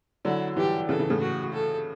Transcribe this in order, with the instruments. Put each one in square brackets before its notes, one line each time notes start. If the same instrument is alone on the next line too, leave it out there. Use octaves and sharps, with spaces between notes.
[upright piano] D3 F#3 [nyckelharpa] E4
[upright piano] E3 G3 [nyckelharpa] G4
[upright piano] C#3 E3 [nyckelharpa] A4
[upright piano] C#3 E3
A2 C#3
[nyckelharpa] F#4
A4